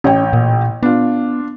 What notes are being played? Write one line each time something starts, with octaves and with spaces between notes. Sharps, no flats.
A1 C#4 C#5 G5
A#2
B3 D4 F4